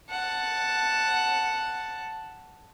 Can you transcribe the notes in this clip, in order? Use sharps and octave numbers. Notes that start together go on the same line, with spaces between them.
F#5 A5